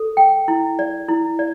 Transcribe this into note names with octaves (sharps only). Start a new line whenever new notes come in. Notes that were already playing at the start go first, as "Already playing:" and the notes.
Already playing: A4
G5
E4
D5
E4
D5